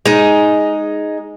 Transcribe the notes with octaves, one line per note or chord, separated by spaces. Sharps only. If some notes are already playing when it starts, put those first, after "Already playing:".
G#3 D#4